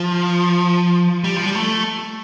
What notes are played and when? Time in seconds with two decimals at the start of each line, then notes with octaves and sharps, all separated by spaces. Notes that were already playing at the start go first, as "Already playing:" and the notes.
Already playing: F3
1.24 G3
1.36 F3
1.45 G3
1.55 A3